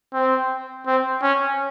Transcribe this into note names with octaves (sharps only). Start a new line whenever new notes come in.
C4
C4
C#4